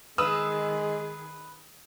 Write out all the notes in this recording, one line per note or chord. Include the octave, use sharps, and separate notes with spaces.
D#3 G#3 G#4 B4 D#6 E6